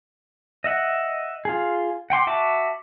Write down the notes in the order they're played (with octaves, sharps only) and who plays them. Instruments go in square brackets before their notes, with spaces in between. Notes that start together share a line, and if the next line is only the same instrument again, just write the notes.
[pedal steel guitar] D#5 E5 F#5
F4 G#4
F#5 G5 C6 D6
F#4 E5 A5 D6